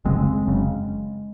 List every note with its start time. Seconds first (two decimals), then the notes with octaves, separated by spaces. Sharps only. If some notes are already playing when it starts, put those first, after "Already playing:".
0.05 F#1 F#2 C#3 G#3 C4
0.46 F#1 F#2 C#3